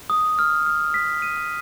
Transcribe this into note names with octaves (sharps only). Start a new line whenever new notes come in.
D#6
F6
F6
B6
D#7